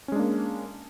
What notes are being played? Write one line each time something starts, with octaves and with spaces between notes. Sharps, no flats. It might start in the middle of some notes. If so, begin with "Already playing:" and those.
G#3 A#3 C#4 D4